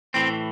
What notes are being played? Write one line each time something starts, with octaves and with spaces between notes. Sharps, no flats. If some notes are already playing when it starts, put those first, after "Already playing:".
A2 E3 C4